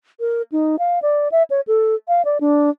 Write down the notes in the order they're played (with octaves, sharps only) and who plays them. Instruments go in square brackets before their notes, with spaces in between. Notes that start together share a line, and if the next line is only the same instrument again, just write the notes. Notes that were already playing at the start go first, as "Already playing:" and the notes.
[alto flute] A#4
D#4
F5
D5
E5
C#5
A4
F5
D5
D4